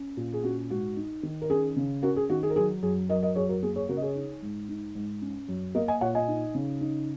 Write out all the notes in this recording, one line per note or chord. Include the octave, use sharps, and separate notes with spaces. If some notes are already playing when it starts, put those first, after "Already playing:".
Already playing: C#4
A#2
G#4
C#4 F#4
G#2 F#4
D#4
D#3
A#4
C#4 G#4
C#3
C#4 F#4 A#4
G#4
D#3 F#4
G#4
A#4
F#3 G#4
F#2 G#4
F#3 A#4 D#5
A#4 D#5
F#2 G#4 C#5
F#4 A#4
A#3 G#4
G#4 C#5
C#3 F#4 A#4
D#5
G#4 C#5
D#4
G#2
D#4
G#2
C#4
F#2
A#3 A#4 D#5
D#5 G#5
A#2 C#5 F#5
D#5 G#5
D#4
C#3
D#4